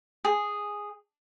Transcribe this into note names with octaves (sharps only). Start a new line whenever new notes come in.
G#4